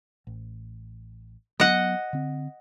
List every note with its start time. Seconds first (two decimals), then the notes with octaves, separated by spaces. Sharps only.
0.27 A1
1.60 F#3 B3 D#5 F#5
2.13 D3 C4